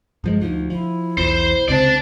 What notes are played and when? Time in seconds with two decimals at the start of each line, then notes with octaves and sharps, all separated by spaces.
0.24 G2 F3 G#3
0.41 D2 F3 D#4
0.70 F3 E4
1.17 B1 E2 C5
1.68 C#2 C3 C5 D5 A5